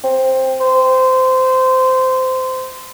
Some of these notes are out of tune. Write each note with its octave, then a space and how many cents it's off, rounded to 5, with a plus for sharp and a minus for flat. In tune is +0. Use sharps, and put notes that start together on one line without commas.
C4 +5
C5 -20